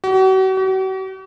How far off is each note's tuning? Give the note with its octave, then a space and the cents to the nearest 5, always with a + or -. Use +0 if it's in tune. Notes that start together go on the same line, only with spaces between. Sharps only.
F#4 +40
F#4 +45